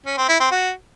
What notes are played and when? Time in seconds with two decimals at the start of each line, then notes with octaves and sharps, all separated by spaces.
0.06 C#4
0.17 C4
0.29 E4
0.40 C4
0.51 F#4